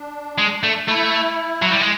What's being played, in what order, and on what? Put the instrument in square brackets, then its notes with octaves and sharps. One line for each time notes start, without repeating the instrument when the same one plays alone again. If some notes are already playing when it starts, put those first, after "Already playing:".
Already playing: [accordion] D4
[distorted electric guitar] G#3
A3
[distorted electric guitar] A3 [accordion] E4
[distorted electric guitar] F#3
G3
G#3